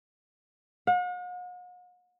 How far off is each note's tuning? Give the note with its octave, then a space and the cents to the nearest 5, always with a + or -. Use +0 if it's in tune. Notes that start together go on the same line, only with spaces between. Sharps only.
F#5 -45